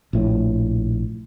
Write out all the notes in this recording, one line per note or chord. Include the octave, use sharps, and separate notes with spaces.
A#1 A2